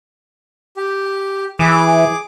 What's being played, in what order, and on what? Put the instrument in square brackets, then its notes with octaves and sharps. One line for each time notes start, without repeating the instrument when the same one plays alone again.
[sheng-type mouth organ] G4
[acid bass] E3 [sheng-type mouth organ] G#4 D6